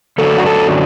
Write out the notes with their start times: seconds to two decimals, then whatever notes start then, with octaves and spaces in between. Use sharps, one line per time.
0.18 F#2 D3 F#3 D4 A4
0.38 F#4
0.47 A4